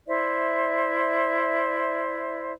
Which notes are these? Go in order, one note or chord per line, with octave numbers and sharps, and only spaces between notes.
E4 C5 D5 E5